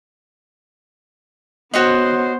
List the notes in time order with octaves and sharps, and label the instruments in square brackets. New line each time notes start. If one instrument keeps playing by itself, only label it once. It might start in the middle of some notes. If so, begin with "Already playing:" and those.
[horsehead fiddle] B3 C5 [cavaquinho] F#4 C#5 D#5